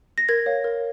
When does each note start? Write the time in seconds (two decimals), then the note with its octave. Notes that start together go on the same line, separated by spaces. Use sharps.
0.18 A#6
0.29 A#4 G#6
0.46 C#5 F5
0.64 A#4